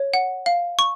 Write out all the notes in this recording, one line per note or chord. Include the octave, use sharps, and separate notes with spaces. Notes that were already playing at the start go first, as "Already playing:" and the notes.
Already playing: C#5
F#5
F5
C#6